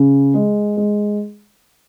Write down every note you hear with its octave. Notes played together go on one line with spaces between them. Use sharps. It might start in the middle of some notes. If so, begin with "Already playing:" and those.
Already playing: C#3
G#3
G#3